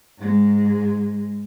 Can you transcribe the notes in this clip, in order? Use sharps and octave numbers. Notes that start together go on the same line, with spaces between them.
G#2 G#3